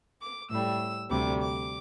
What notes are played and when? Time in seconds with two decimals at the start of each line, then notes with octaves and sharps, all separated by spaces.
0.21 D6
0.50 A2 G3 E6
1.10 D2 C3 G3 D6
1.40 D6